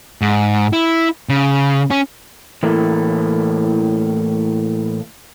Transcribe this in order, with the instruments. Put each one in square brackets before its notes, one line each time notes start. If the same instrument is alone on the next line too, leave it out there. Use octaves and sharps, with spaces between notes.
[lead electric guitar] G#2
E4
C#3
C#4
[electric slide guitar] A2 E3 A3 A#3